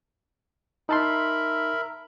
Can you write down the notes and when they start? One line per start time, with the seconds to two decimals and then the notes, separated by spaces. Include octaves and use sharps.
0.89 D#4 A#4 E5 A5 B5 C6